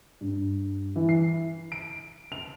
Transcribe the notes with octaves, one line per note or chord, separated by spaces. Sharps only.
G2
E3
C7
D7
F7